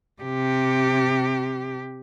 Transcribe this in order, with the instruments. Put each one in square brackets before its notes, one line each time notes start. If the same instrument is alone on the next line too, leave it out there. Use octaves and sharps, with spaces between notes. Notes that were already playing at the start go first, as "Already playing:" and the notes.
[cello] C3 G4